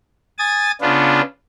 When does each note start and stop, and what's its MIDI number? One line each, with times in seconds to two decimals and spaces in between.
0.38 0.71 80
0.38 0.71 87
0.38 0.71 93
0.81 1.21 49
0.81 1.21 59
0.81 1.21 62
0.81 1.21 65